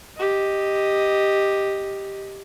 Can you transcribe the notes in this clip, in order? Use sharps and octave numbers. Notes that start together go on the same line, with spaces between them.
G4 D#5